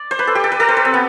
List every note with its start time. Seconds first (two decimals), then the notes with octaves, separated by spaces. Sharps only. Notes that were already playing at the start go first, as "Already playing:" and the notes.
Already playing: D5
0.11 C5
0.19 B4
0.27 A4
0.35 G4
0.44 A4
0.52 B4
0.60 A4
0.68 C5
0.77 B4
0.85 C4
0.94 B3